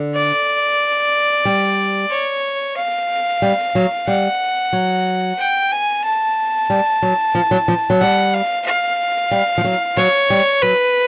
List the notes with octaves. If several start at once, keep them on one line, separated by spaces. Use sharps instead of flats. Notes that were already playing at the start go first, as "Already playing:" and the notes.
Already playing: D3
D5
G3
C#5
F5
G3
F#3
G3 F#5
F#3
G5
G#5
A5
G3
F#3
F3
F#3
F3
F#3
G3 F#5
F5
F5
G3
F3
F#3
F#3 C#5
G3
F#3 B4